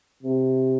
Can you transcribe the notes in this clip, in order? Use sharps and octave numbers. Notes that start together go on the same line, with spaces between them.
C3